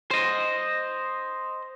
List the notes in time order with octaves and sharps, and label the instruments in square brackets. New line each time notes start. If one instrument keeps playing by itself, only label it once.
[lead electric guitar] C5 D#5